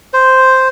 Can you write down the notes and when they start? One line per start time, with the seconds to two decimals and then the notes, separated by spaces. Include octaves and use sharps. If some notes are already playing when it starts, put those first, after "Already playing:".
0.13 C5